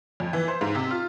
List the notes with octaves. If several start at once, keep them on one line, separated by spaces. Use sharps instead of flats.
F2
E3
C5
G#2
C3
F4